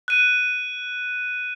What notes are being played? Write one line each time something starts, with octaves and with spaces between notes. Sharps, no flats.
F#6 D#7